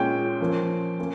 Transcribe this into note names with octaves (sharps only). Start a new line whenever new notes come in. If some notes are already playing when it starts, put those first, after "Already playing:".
Already playing: A#2 G#3 C#4 G5
F3 A#3 C#4
A#3 C#4